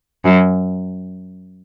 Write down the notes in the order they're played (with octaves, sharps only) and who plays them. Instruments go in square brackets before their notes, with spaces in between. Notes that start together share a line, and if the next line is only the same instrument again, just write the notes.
[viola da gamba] F#2